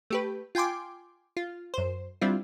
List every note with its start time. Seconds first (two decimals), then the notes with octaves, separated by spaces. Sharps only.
0.10 A3 G4 B4
0.55 F4 G5 G#5 C6 D6
1.37 F4
1.74 F#2 C5
2.21 G3 C4 D4 E4 F4